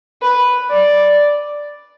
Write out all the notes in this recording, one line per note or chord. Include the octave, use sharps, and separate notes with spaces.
B4
D5